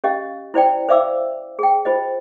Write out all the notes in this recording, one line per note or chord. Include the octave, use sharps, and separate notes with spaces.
C#4 G4 D#5 F5
E4 C5 D5 G5
C5 D5 E5 F5 D6 E6
G#4 G5
F4 C5 D#5